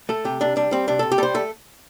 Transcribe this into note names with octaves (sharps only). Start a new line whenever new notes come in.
A3 A4
C3 G4
C3 D4
G3 D4
G3 C4
C3 D4
C3 A4
G4
G3 A4 C5
A3 A4